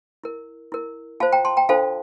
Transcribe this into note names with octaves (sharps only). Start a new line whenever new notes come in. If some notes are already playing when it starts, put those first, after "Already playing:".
E4 A#4
E4 A#4
F4 C5 F5 A5
G5 A#5
A5 C6
G5 A#5
D4 F4 A4 C5 F5 A5